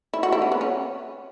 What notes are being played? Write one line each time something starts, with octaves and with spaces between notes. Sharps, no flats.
E4
F#4
E4
C#4
B3
C#4